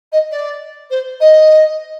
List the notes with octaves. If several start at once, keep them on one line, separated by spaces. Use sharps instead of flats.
D#5
D5
C5
D#5